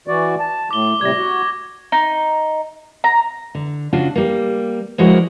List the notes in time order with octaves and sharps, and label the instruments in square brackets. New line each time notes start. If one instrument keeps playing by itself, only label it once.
[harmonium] E3 F#4 D5
A5
[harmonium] A2 [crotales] D6 G7
[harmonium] A2 C3 G3 [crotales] G#6 A#6
[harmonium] F#4
[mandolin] D#4
A#5
[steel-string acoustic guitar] D3
C#3 D4 F4 F#4
G3 A#3
F3 G#3 E4 F#4 A#4 D5